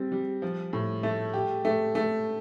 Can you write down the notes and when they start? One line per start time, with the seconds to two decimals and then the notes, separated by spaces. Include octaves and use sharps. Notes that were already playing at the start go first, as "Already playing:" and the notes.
Already playing: G3 C4
0.12 G3
0.42 F3
0.73 A2
1.03 A3
1.34 G4
1.65 A3
1.95 A3